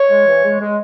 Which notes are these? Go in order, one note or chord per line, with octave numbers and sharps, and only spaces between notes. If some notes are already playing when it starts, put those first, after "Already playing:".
Already playing: C#5
G#3
E3
G#3
G#3